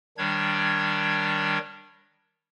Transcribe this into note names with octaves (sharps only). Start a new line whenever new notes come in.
D#3 G3 D4 C#5 G#6